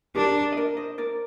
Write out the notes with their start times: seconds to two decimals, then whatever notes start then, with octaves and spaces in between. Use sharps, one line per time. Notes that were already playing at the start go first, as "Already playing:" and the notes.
0.16 D4 G4 A#4
0.52 D#5
0.57 A#4 D5
0.77 C5 D#5
0.98 A#4 D5